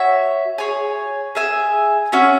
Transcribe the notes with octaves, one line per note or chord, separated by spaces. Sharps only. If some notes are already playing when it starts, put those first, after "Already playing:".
Already playing: F#4 C#5 E5
G#4 C#5 G#5
G#4 E5 G#5
C#4 F#4 C#5 E5